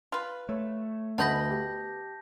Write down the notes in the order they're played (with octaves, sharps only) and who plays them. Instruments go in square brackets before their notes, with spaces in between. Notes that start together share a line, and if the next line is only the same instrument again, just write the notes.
[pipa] F4 B4
[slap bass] A3 [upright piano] C#5
[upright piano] D2 [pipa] B3 D#5 B5 [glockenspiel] A5 G6 A#6
[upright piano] G4